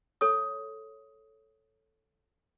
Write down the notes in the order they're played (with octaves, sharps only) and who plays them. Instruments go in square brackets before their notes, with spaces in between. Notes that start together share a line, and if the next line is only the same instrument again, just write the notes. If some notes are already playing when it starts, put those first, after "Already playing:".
[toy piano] A4 C#5 C#6 D#6